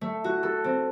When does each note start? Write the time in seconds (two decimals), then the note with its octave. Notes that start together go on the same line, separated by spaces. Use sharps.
0.01 A3
0.24 F#4
0.43 A4
0.64 C4